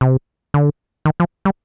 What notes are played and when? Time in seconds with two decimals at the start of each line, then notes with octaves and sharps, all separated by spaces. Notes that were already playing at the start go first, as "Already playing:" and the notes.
0.01 C3
0.54 D3
1.05 D#3
1.20 F3
1.45 G3